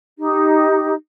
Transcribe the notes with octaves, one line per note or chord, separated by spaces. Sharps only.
D#4 G4